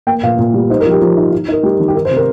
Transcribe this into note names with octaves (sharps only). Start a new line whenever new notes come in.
A#3 G5
A#2 F5
A#2
G3
D#4 C5
A#4
F3
G4
F3
D#4
D#4
D#4 A#4
G3 G4
D#3
G4
D#4 A#4
C5
C3
A#4